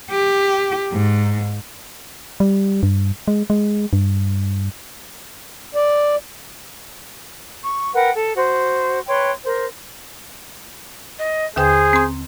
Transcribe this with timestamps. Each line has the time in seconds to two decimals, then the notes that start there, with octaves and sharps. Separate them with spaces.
0.10 G4
0.92 G#2
2.40 G3
2.83 G2
3.28 G#3
3.50 G#3
3.93 G2
5.75 D5
7.62 C#6
7.94 A#4 B4 F#5 G5
8.15 A4
8.36 F#4 C5
9.07 B4 C#5 G5 C6
9.45 A#4 C5
11.18 D#5
11.56 D#2 D3 G#4 C5 G5
11.93 C4 C6